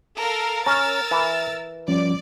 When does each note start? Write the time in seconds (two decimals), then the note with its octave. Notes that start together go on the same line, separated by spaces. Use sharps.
0.19 A4 A#4 F5
0.66 C#4 A#4 A#5 E6 F6 A6
1.11 E3
1.88 F3 G3 C#4 D5